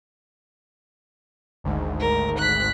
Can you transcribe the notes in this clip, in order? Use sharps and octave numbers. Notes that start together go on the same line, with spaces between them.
G#1 D2 G#2
A#4
F#6 B6